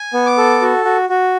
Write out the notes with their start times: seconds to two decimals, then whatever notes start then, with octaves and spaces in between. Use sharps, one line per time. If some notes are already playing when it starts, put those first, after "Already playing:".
Already playing: G#5
0.13 B3
0.26 D6
0.38 A4
0.61 F#4
0.85 F#4
1.09 F#4